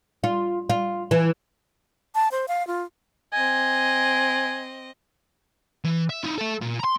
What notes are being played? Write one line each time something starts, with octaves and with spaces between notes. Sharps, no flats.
F4
F4
E3
A5
C5
F5
F4
C4 D#5 G#5
E3
E5
D#4 E4
A4 E5
A#2
A#5 C6